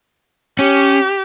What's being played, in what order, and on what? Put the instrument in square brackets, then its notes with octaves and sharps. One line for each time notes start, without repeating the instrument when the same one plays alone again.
[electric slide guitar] C#4 [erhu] G4